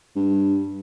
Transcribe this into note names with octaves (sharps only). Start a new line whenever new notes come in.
G2